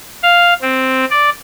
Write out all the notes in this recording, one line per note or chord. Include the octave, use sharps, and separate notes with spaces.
F5
C4
D5